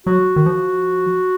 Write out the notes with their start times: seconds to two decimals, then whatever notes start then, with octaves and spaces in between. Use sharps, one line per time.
0.07 F#3 F#4
0.36 D#3
0.46 F3